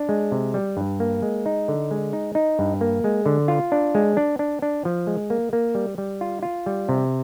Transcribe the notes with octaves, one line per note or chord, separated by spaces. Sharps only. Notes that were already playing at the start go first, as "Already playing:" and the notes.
Already playing: D4
G#3
C3
G3
G2
A#3
G#3
D#4
D3
G#3
D#4
D#4
G2
A#3
G#3
D3
F4
D4
G#3
D4
D4
D4
F3
G#3
A#3
A#3
G3
G3
F4
F4
G3
C3